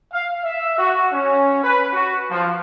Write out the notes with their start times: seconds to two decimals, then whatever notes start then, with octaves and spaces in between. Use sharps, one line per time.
0.13 F5
0.44 E5
0.78 F#4
1.13 C#4
1.64 B4
1.93 F#4
2.31 F3